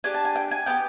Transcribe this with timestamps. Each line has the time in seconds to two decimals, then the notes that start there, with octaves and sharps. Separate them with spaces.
0.04 D4 G4 G#5
0.14 A5
0.25 G#5
0.36 G5
0.51 G#5
0.66 B3 E4 G4 G5